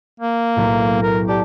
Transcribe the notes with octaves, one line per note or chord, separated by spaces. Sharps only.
A#3
B1 A2
A#4
G4 D5 A5